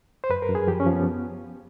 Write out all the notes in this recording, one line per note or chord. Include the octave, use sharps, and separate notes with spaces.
C5
F#2 B4
A#4
F#2
G#4
F3 G4
C#4
F3
B3